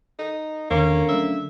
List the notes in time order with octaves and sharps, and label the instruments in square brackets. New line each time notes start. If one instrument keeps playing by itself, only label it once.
[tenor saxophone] D#4 [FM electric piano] A4
[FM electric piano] E2 D#3 [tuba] D3 [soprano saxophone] A#3 [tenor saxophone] C#4
[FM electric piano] F#3 A3 C#4 [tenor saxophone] E5